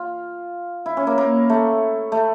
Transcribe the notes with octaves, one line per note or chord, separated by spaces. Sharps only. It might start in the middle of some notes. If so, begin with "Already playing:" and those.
Already playing: F4
E4
C#4
A#3
A#3
A3
A3